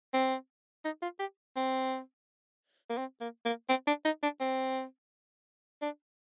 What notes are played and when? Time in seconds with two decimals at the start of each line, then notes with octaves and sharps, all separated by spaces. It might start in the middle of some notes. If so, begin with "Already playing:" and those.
0.14 C4
0.85 D#4
1.02 F4
1.20 G4
1.56 C4
2.90 A#3
2.98 C4
3.21 A#3
3.45 A#3
3.69 C4
3.87 D4
4.05 D#4
4.23 D4
4.40 C4
5.82 D4